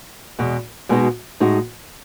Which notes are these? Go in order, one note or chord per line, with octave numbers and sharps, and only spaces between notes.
E2 B2 G#3
B2 G#3 B3 D#4 F#4
A2 G#3 D#4 F#4